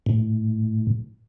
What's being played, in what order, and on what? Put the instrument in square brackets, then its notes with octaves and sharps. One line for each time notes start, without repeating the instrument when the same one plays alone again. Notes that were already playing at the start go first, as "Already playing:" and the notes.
[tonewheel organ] A2